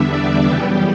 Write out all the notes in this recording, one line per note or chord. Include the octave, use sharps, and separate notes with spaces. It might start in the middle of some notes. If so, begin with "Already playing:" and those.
Already playing: E2 D3 G3 B3 D4 E5
D5
F#2 C#3 E3 G3 B3 G4